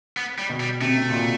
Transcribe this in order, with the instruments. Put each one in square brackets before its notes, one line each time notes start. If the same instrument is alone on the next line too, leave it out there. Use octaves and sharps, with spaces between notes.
[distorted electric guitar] B3
G3
[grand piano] B2
[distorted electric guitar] G3
[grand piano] C3 [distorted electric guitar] A3
[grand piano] C3
A#2
B2